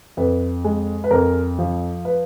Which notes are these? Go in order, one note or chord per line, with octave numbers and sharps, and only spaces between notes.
F2 B4
G#3
B4
F2 A#4
F3
B4